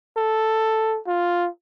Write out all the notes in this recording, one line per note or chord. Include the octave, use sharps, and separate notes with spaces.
A4
F4